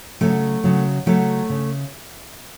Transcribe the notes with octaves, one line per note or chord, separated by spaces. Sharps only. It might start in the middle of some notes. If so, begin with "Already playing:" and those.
C#3 F#3 A3
C#3 F#3
C#3 F#3 A3
C#3